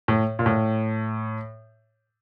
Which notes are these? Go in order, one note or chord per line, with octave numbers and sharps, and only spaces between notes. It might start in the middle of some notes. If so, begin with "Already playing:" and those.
A2
A#2
A2